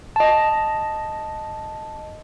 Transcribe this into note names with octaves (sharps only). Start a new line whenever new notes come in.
D#5 A5